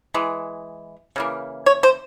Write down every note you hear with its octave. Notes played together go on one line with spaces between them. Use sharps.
E3 G#3
C#3 E3 A#3
C#5
C5